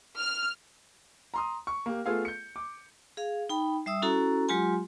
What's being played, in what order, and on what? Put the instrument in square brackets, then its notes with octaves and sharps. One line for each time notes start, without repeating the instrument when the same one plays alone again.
[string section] F6
[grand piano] A#5 C6 D#6
C#6
A#3 G4
A3 B3 F4 G#4 A4 F5
G6 C#7
D6
[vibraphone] G#4 F5
D#4 G5 B5
G3 E5 D#6 E6
C#4 E4 F#4 A4 A#5
F#3 G#3 F4 G4 G#5 C6